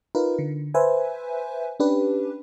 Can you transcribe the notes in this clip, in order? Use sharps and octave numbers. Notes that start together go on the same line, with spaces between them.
D#4 F4 A#4 B4
D3
B4 C5 E5 G#5
C#4 D4 G4 B4